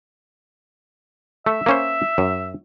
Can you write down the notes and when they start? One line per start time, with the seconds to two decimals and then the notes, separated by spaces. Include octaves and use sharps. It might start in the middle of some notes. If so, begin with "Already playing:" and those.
1.46 A3 E5
1.66 A#3 C#4 C5
2.18 F#2